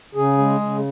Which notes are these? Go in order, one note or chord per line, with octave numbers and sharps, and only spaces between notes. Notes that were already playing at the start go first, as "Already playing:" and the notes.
C#3 G#4
G#3
C#3